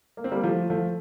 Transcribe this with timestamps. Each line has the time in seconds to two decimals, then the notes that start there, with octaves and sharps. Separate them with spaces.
0.17 A#3
0.24 C4
0.31 G3 A#3
0.43 F3 A3
0.70 F3 A3